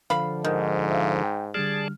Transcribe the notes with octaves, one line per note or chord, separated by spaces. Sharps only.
D3 F3 F5 B5
G#2 D#3
E5 F5
G5
D3 G3 G#4 D5 A5 F6